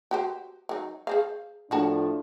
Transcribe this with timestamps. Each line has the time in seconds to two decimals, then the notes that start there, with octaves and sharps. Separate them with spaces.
0.11 F#4 G4 C5
0.69 F#3 D#4
1.07 G#4 C5 F5
1.71 A2 F3 A#3 D4 F#4 A5